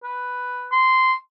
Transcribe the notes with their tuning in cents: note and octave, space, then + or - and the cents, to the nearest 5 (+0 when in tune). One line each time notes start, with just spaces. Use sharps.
B4 +0
C6 -10